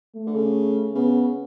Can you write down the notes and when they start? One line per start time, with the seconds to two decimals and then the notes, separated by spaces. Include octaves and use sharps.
0.15 A3
0.27 D3
0.35 C#3
0.94 C#3 B3